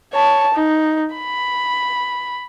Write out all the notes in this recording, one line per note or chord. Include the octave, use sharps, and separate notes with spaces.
C#5 A5
D#4
B5